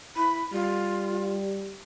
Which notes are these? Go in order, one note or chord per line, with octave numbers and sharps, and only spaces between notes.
E4 B5
G3 F4